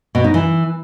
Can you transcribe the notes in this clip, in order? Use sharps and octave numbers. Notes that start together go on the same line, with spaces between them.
B2
D#4
E3